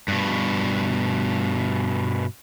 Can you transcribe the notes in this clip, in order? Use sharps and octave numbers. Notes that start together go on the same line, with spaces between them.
G2 B2